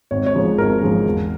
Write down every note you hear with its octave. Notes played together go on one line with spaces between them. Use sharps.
G#1 C#5
C#5
G#2 F3 G#3
G#1 A#4
G#2 F3 G#3
E2